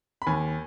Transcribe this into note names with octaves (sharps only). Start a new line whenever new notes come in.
B5
D#2 G#5